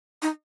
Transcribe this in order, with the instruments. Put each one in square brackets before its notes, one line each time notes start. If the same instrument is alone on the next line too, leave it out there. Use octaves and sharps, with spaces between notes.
[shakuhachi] D#4